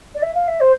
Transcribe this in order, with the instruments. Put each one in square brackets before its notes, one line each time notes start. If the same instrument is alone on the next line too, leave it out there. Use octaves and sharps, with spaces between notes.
[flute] D5
E5
F5
E5
C5